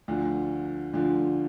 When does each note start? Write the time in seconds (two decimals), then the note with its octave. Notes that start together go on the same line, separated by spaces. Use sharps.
0.08 D2 D3 F3
0.93 D2 D3 F3